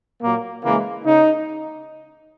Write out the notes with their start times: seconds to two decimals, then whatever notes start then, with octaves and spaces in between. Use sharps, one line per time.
0.22 A#2 F#3 A#3
0.64 C#3 E3 G#3 A#3
1.05 C#3 D#4